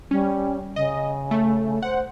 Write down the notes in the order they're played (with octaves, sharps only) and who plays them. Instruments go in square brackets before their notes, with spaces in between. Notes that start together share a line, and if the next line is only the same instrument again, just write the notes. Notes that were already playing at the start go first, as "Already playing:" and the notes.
[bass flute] G3 [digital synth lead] C#4
[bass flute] C#3 [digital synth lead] D#5
[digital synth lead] A3
[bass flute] C5 [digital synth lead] F#5